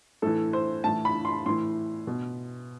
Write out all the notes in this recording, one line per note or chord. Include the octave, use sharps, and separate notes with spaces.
A2 E3 A4
C5
A2 E3 A5
B5
C6
A2 E3 C6
B2